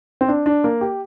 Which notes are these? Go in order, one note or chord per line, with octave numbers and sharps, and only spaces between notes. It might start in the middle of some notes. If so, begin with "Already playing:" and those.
C4
D4
D4
A#3
G4